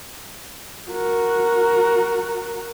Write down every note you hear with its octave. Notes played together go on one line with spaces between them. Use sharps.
F#4 A#4